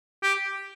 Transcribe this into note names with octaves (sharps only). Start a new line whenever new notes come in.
G4